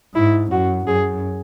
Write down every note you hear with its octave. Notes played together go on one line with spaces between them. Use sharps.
G#2 E4
F#2 F#4
F#2 G#4